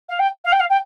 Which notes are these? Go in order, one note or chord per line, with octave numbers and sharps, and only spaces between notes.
F5
G5
F5
G5
F5
G5